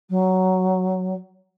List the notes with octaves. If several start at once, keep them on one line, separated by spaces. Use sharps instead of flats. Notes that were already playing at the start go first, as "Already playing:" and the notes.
F#3